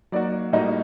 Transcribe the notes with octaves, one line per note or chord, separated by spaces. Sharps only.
F#3 A#3 D#4 F#4 D5
A2 G3 A#3 D#4 F#4 D#5